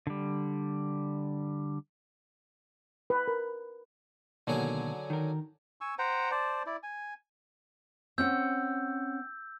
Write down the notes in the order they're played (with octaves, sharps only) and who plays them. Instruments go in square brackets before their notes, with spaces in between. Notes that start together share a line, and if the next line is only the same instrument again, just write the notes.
[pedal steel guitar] D3 G3
[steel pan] B4
A#4
[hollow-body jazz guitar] B2 D#3 A#3 [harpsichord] D3 F#3 G#4
[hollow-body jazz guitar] D#3 A#4
[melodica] G#5 C#6 E6
C5 F#5 G5 A#5
C5 D5 A5
E4 D5
G#5
[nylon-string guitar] C4 C#4 F#5 [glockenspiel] E6 G6